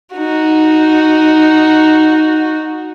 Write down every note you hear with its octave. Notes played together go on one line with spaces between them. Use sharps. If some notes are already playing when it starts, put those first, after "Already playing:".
D#4 F#4